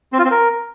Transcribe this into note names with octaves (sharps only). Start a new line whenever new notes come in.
C4
F4
C4
A#4